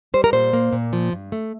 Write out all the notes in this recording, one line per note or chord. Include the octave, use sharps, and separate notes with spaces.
G3 C5
A#4
A#2 C5
A#3
A#2
F3
G2
A3